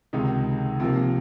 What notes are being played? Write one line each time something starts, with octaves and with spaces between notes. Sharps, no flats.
C#2 C3 D#3 G#3 D#4
C3 F3 A#3